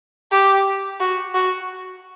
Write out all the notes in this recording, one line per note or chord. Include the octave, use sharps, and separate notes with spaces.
G4
F#4
F#4